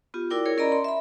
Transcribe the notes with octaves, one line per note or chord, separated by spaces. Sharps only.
B3 F4 G4
E4 F#4 A#4 D5 G5 D6
G#4 A#4 C#5
C#4 A#4 D5 D#5 A#5 B5
C6
E5 B5